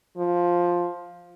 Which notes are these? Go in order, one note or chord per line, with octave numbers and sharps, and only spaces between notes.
F3